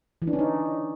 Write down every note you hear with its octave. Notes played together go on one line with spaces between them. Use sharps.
E3
D4
C#4
D#4